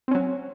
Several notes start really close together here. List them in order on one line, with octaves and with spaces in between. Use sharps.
C4 C#4 F#3